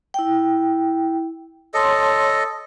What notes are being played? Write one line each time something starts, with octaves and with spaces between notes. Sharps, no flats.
E4 G5
A4 C#5 D#5 A5 C6